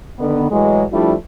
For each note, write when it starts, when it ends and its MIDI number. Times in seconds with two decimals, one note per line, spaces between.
0.19 0.46 50
0.19 0.46 51
0.19 0.46 59
0.50 0.83 45
0.50 0.83 52
0.50 0.83 54
0.50 0.83 56
0.92 1.14 53
0.92 1.14 55
0.92 1.14 57
0.92 1.14 62
0.92 1.14 64
0.92 1.14 65